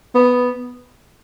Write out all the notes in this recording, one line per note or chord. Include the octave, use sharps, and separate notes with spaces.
B3